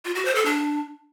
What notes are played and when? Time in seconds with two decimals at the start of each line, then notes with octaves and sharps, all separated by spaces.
0.05 F4
0.15 F#4
0.25 C5
0.35 A4
0.45 D4